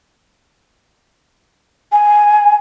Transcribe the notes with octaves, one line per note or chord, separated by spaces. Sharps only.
G#5